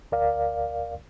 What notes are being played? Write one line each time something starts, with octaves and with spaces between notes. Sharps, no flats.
D2 A#4 D5 F5